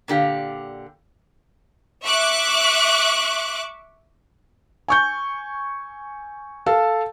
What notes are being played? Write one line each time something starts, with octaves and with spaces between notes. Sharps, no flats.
A#2 D3 G4 F5
E5 C#6 D6 F#6
G#5 C#6 G6
A4 F5 A5